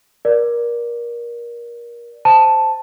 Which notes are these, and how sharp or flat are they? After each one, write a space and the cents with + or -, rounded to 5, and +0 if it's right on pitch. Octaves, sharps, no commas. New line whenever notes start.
A#4 +25 D5 +0
C5 +0 A5 +0